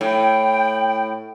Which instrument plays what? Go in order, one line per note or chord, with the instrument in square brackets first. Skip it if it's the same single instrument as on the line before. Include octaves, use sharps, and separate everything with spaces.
[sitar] A2 [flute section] G5